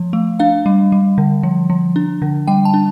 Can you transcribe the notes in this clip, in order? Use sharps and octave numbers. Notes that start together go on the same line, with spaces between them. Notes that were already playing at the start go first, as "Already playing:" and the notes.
Already playing: F3
A3
D4 F5
G3
G3
D3
F3
F3
D4
D3
G3 G5
A5
D4